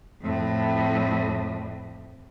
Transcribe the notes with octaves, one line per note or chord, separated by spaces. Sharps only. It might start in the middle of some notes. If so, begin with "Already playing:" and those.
F2 A2